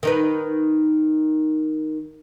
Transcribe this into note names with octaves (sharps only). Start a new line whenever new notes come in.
D#3 D#4 B4